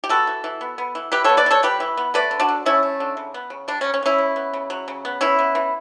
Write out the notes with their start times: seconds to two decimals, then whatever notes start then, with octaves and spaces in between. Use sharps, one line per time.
0.04 G4
0.09 B3 F#4 A4
0.27 E3
0.44 E3
0.61 B3
0.78 B3
0.95 E3
1.12 E3 G4 B4
1.24 B3 A4 C#5
1.37 B4 D5
1.46 E3
1.50 A4 C#5
1.63 G3 G4 B4
1.80 E3
1.97 B3
2.14 A3 B4 D5
2.31 D3
2.40 D4 F#4
2.48 D3
2.66 A3 C#4 E4
2.83 A3
3.00 D3
3.17 C#3
3.34 B3
3.50 C#3
3.68 G3 D4
3.81 C#3 C#4
3.94 C#4
4.03 B3
4.06 C#4 E4
4.18 C#3
4.36 B3
4.53 C#3
4.70 F#3
4.88 C#3
5.05 B3
5.21 E3 C#4 E4
5.39 B3
5.55 E3